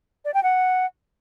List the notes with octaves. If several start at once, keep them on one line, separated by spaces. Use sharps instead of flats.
D5
G5
F#5